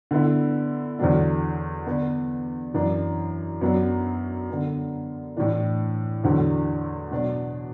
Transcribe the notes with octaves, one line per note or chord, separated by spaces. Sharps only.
D3 B3 E4
E2 D3 F#3 D4
D3 B3 D4
F#2 E3 D4
F#2 F#3 B3 D4
D3 B3 D4
A2 E3 D4
E2 D3 F#3
B2 F#3 D4